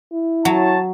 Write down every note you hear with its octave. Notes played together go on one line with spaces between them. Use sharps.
E4
F#3 C#5 A5